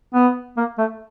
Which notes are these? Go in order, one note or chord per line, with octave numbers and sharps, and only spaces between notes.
B3
A#3
A3